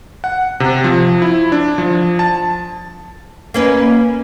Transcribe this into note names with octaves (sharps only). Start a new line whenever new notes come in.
F#5
C3
F3
E4
D4
F3
A5
A#3 C#4 B4